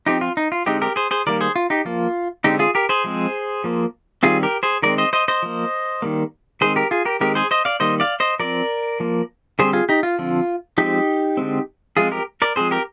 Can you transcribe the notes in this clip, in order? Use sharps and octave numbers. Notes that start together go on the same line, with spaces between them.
F3 C4 D#4 G4
F4
D#4
F4
D3 G#3 C4 D#4 G4
G4 A#4
G#4 C5
G#4 C5
D#3 G3 A#3 A#4 D5
G#4 C5
F4
D#4 G4
F3 A#3 F4
D3 G#3 C4 D#4 G4
F4 G#4
G4 A#4
G#4 C5
F3 G#3 C4
F3 A#3
D#3 G3 C4 F4 G#4
G4 A#4
G#4 C5
D#3 G#3 C4 A#4 D5
C5 D#5
C5 D#5
C5 D#5
F3 A#3
D#3 G3 A#3
D#3 G#3 C4 G#4 C5
G4 A#4
F4 G#4
G4 A#4
D#3 G#3 C4 G4 A#4
G#4 C5
C5 D#5
D5 F5
D#3 G3 A#3 C5 D#5
D5 F5
C5 D#5
F3 C4 A#4 D5
F3 A#3
D3 G3 C4 G#4 C5
F4 G#4
D#4 G4
F4
D3 F3 C4
F3 G#3 C4 D#4 G4
D3 G#3 C4
F3 G#3 C4 F4 G#4
G4 A#4
A#4 D5
F3 G#3 C4 G#4 C5
G4 A#4